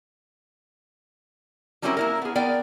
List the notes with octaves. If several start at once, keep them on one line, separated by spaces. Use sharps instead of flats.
F#3 G3 C4 C#4 E4 A#4
A#3 E4 A#4
B3 G#4
B3 A#4 D5 G5